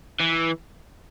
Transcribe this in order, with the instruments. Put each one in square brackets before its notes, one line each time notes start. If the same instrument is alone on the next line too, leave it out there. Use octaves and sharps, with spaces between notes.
[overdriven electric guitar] E3